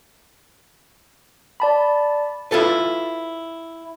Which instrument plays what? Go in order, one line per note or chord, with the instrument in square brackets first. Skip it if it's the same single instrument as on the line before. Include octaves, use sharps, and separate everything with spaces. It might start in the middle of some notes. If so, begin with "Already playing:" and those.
[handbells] D5 A5 B5
[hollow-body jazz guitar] E4 F4 A4 B4